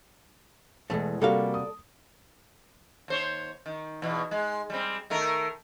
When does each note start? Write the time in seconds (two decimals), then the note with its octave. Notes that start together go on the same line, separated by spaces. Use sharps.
0.90 E2 B2 E3 G#3 A3 G#4
1.22 C3 G3 A#3 F#4 A4 D5 F5
1.54 D#6
3.08 D#2 C5 C#5
3.66 D#3
4.02 E2 B2
4.31 G#3
4.70 G3 G#3 C4
5.10 D#3 A3 A#4